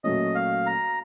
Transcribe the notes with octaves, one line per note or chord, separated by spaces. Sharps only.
A#2 F#3 A3 C#4 D#5
F5
A#5